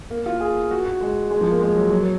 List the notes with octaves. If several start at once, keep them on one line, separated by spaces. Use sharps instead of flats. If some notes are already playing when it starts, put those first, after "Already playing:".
A#3
F4
G#4
F#4
F#4
G#3
G#3
F3
A#3
G#3
F#3
F#3
F#3